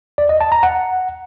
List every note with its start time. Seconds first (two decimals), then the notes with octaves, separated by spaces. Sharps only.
0.18 D5
0.29 D#5
0.41 A5
0.52 A#5
0.63 F#5